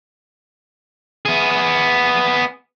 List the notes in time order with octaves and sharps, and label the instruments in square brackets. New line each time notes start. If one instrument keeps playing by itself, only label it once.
[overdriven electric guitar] B3 G#4